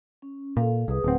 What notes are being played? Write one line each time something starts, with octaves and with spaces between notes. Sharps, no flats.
C#4
A#2 A4 F5
C2 G#4 B4 D#6
D1 A3 C4 B4 F#5